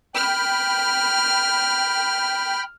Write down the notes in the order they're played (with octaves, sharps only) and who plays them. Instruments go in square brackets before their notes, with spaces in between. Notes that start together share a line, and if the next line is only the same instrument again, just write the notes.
[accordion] G5 B5 [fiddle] F6